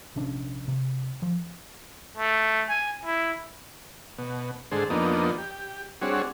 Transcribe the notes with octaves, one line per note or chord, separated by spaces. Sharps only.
A#1 C3 C#4 D4
C3
F3
A3
G#5
E4
B2
G#2 D3 G#4 A4 C5
F2 A#3 B3 D4 D#4
G4
G3 C4 D4 F#4 G#4 C#5